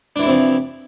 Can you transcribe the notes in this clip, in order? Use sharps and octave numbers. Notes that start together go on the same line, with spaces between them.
C3 E3 F3 D4 E4